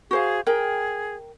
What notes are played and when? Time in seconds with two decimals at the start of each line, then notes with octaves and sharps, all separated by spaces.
0.11 F#4 G#4 C5 F5
0.47 G#4 A#4 G5